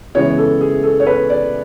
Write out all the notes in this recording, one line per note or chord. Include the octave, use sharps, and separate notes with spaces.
C#3 E3 G#3 B3 C#5
A4
G#4
A4
C#5
B4
D5